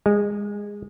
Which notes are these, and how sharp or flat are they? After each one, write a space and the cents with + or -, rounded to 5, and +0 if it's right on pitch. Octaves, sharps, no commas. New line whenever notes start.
G#3 -20